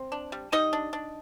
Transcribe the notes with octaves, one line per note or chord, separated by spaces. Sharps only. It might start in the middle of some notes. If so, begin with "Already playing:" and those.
Already playing: C4
D4
G3
G3 D#4 D#5
D4
D4